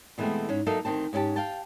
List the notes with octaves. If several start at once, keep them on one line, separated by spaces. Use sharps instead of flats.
B2 E3 G#3 A3 B3 C4
G#2 C#4
F#3 A#3 D#4 A4 E5 F5
D2 D#3 C4 A5
G#2 C#4 E4 G4 A5
F5 G5 A5